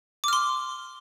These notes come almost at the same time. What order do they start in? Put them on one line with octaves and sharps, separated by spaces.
D6 F6 C6